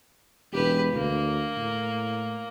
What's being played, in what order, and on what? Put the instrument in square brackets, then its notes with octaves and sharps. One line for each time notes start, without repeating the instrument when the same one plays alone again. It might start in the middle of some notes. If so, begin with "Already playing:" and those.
[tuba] E1 [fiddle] G4 B4
[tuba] D2 [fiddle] A#3
[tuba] A2